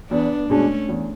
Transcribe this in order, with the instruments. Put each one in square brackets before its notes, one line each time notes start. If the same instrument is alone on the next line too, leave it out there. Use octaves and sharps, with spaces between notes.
[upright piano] E2 [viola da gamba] B3 D4
[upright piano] B2 G#3 D4 [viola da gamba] A3 C#4
[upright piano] E2